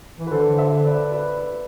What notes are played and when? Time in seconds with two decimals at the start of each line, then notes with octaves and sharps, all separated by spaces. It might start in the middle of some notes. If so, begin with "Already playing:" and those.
0.19 E3
0.27 B4
0.31 D3 A4 C5
0.58 C5 E5
0.85 B4 D5
1.12 B4 D5